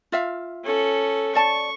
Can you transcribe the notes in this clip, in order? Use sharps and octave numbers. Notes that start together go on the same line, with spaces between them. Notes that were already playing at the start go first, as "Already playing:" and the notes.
F4 E5 F5
C#4 A4
D5 A5 C#6